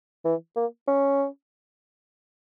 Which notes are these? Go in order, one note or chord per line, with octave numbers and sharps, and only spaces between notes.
E3
A#3
C#4